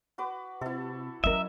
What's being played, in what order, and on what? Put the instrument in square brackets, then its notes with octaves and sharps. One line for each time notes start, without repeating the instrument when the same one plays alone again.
[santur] F#4 B4 D6
[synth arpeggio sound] C3 [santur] E4 A4
[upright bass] F#3 C#4 [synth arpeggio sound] A#4 D#5 [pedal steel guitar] E5